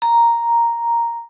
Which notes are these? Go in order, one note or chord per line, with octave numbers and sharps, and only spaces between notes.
A#5